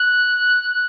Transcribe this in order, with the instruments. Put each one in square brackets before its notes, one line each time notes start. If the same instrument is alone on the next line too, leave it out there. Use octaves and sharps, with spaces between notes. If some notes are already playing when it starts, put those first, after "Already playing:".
Already playing: [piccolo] F#6